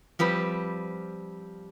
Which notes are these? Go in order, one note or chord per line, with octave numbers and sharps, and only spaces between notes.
F3 G3 C4 B4